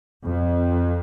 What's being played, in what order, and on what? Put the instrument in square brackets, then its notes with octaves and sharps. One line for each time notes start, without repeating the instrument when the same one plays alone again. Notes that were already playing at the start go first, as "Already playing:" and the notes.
[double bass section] F2